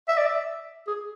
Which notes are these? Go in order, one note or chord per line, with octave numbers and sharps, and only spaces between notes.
E5
D5
E5
G#4